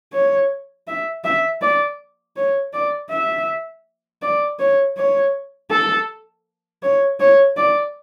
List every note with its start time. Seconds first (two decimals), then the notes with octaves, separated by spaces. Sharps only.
0.13 C#5
0.87 E5
1.24 E5
1.61 D5
2.36 C#5
2.73 D5
3.10 E5
4.22 D5
4.59 C#5
4.97 C#5
5.71 A4
6.83 C#5
7.20 C#5
7.57 D5